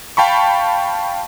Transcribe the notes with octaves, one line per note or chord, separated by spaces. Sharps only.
F5 G5 A5 B5 C#6